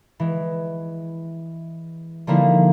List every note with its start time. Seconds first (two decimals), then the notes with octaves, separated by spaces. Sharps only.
0.20 E3 G#3
2.27 D3 F3 G3 A#3 D#4 E4